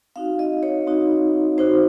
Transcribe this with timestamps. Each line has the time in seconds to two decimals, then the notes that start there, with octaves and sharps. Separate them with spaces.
0.16 C4 D#4 F#4 F5
0.39 D#5
0.63 C#5
0.87 C4 D#4 F#4
1.58 C4 D#4 F#4 C5